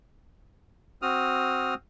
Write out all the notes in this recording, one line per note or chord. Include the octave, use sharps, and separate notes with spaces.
C4 F#4 D#6 F6